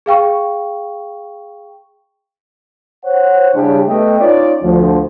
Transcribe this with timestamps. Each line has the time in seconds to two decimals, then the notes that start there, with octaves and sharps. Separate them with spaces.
0.06 G#4 F5 G5 C#6
3.04 C5 C#5 F#5
3.53 C#3 G3 C#4 D4 E4 G4
3.87 A3 B3 B4 D#5 E5 G5
4.18 C#4 D#4 F4 C#5 D5
4.62 D2 F3